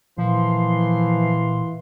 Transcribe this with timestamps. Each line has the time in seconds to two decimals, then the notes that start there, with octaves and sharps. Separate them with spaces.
0.18 A#2 E3 F3 F5 C6